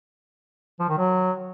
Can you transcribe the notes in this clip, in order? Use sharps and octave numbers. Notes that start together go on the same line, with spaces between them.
F3
D#3
F#3